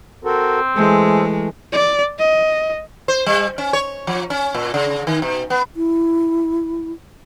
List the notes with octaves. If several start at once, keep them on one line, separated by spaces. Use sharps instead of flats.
C4 F#4 A4 A#4
E3 G#3 A3 G#4 A4 C5
D5
D#5
C5
G3
C#4
C#5
F3
C#4
A#2
C#3
D#3
B2
B3
E4